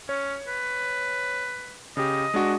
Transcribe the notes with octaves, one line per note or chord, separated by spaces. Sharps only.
C#4 C#5
B4
C#3 G4 D#5
G#3 D4 F#4